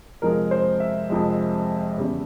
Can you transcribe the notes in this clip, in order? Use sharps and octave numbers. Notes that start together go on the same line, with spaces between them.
F2 C3 F3 G#3 A#4
C5
E5
F2 C3 F3 G#3
E2 C#3 G3